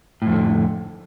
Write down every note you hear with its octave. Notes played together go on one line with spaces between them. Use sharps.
F2 A2 D3